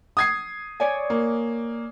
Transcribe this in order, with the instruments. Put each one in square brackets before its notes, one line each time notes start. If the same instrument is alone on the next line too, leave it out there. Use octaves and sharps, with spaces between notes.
[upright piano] D#6 G#6 C7
[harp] C#5 D5 G#5
[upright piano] A#3